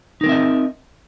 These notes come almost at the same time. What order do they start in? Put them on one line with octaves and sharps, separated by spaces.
D#4 A#4 C4 E5 D#5